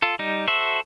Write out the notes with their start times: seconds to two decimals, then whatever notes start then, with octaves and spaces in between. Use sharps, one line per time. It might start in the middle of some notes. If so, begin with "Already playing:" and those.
0.02 F4 A4
0.19 G3 D#4
0.48 F#4 A4 C5 E5